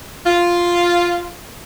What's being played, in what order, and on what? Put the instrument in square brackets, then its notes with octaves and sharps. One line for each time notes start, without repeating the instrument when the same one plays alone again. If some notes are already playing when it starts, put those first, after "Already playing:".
[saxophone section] F4